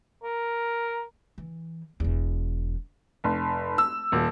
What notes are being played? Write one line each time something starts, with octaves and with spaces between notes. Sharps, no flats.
A#4
E3
E1 E2
F1
E6
D#1